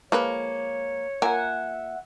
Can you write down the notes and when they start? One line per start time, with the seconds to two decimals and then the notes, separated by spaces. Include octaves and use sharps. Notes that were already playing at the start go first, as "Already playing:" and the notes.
0.12 F3 G#3 A#3 B4 C#5
1.22 A#3 F4 A#4 E5 F#5 G#5